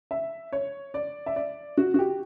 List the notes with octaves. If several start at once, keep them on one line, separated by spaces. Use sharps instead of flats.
E5
C#5
D5
E5
D5
F#4
F#4
G4